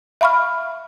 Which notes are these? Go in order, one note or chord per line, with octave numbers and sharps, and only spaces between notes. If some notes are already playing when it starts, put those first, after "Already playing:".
E5 F5 B5 C#6 F6